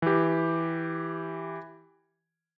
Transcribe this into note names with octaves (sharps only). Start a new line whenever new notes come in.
E3 G4